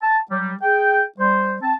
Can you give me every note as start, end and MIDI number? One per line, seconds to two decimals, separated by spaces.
0.02 0.18 81
0.29 0.52 54
0.29 0.52 55
0.62 1.02 68
0.62 1.02 79
1.18 1.54 55
1.18 1.54 72
1.61 1.74 60
1.61 1.74 81